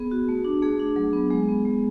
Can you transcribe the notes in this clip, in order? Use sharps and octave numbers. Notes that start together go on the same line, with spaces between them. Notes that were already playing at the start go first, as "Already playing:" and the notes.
Already playing: B3 G#4
F#4
A3
D4
A3 G#4
D4
F#3
B3
G#3
B3
G#3